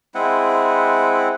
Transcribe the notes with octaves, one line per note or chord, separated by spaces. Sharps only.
G#3 C4 E4 F#5